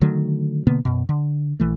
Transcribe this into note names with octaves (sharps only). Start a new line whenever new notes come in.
D3 D#3 F#3 A3
B2 D3 A#3 B3
F#2 B2
D3
A#1 E3 A3